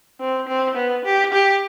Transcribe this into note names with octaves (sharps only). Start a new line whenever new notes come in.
C4
C4
B3
G4
G4